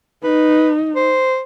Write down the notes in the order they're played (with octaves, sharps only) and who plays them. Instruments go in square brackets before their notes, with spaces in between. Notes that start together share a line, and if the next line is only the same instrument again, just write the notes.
[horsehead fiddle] D#4 [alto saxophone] B4
[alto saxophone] C5